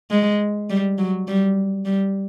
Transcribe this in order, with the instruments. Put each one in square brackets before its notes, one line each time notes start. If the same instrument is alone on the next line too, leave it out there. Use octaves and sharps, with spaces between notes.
[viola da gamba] G#3
G3
F#3
G3
G3